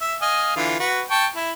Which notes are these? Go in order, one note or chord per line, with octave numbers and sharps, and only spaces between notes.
E5
D#5 F5 G#5
D3 E3 F4
F#4 B4
G5 A5 C#6
E4